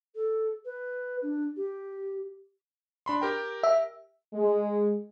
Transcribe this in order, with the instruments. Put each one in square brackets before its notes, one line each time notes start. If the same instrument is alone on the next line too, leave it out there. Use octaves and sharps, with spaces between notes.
[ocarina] A4
B4
D4
G4
[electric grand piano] D4 B5 C6
G4 A#4 G5
[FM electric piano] E5
[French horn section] G#3